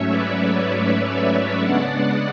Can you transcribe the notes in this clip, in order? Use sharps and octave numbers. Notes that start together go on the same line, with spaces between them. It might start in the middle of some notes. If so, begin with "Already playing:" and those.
Already playing: G#2 F#3 A3 C#4 C#5 E5
B4 D5
C#5 E5
C#3 G#3 B3 D4 D5 F#5